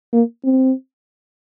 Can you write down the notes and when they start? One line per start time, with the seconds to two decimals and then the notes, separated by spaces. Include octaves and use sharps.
0.13 A#3
0.44 C4